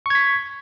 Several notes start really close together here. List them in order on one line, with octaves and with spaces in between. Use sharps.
C#6 G#6 B6